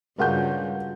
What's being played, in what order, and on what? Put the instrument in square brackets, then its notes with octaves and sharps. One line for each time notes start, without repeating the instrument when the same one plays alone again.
[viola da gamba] G2 C#3 [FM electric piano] G#3 F4 F#4 [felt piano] A#4 F#5 G6